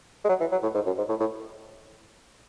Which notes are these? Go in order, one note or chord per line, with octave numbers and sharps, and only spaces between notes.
G#3
F#3
E3
F#3
A2
G#2
F#2
G#2
A2
A2